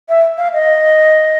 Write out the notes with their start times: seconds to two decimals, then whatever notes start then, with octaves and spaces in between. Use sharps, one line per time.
0.09 E5
0.38 F5
0.53 D#5